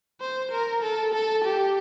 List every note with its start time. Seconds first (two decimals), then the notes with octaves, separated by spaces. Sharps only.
0.21 C5
0.52 A#4
0.82 A4
1.14 A4
1.44 G4